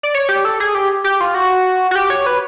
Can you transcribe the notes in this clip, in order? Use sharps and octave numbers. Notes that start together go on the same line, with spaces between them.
D5
C#5
G4
A4
G#4
G4
G4
F4
F#4
F#4
G4
C#5
B4